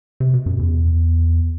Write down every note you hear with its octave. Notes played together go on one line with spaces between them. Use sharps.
C3
B2
F#2
E2